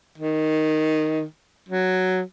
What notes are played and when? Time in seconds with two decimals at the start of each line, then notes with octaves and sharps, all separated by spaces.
0.18 D#3
1.69 F#3